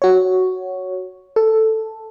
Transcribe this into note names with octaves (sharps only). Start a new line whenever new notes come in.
F#4 C#5
A4